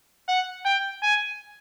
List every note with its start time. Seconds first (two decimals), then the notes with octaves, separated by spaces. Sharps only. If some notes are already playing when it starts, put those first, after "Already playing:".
0.28 F#5
0.65 G5
1.02 G#5